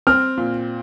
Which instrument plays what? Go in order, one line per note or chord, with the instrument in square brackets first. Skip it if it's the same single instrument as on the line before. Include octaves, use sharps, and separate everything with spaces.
[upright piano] C4 [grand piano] F6
[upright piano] A#2